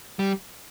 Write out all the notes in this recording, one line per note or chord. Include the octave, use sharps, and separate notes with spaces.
G3